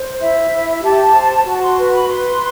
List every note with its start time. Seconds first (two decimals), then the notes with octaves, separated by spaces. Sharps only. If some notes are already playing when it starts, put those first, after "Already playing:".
Already playing: C5
0.20 E4 E5
0.51 E4
0.82 G4 A5
1.15 C5
1.45 F#4 A5
1.61 C6
1.77 B4
1.93 B5
2.08 B4 C6